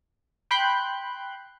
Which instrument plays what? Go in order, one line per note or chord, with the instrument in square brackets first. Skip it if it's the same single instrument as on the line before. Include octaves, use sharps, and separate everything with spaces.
[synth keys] G5 B5 C6 F#6 G6